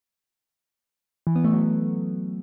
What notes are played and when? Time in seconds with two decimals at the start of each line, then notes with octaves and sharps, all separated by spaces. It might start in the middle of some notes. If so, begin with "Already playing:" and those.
1.27 E3
1.36 B3
1.44 A3
1.53 F#3